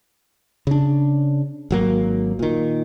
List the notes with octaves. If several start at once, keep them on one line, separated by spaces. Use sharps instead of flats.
C#3 D4
G#1 F#3 A#3
A#2 D#3